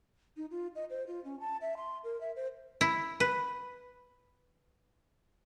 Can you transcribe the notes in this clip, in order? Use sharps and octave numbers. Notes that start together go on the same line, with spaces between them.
D#4
F4
D#5
C5
F4
C#4
A5
E5
C6
A#4
E5
C5
E4
B4